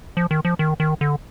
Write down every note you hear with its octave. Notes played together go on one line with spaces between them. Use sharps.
F3
D#3
F3
D#3
D#3
D3